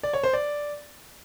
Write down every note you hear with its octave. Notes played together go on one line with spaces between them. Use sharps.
D5
C#5
C5
D5